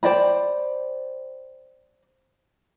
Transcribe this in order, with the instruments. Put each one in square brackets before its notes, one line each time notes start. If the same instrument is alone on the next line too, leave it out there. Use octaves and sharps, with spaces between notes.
[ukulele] C5 D5 G5 B5